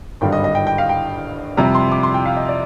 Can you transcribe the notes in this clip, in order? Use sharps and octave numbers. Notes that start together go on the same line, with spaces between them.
G#1 G2 D3 G3 G5
D#5
D#5
G5
G5
F5
G5
F2 C3 G3 A#5
C6
D6
C6
G5
F5
D#5
D5